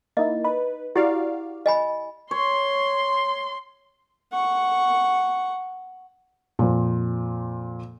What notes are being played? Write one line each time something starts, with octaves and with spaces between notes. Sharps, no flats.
A#3 D#4 E4 D#5
D#4 B4
E4 F#4 G4 D5 F5
D#5 G#5 B5
C#5 C6
F#5 C#6
F2 A#2